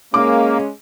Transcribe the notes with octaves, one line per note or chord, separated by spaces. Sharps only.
G#3 A#3 C#4 D6